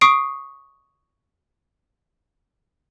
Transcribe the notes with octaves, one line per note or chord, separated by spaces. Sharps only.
C#6 D#6 C7 D7